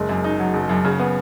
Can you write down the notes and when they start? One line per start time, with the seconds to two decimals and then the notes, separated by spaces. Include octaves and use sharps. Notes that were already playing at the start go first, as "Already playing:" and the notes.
Already playing: F#1 G#3
0.09 F#2
0.24 D#4
0.39 F#3
0.54 F#1
0.69 F#2
0.85 C#3
1.00 B3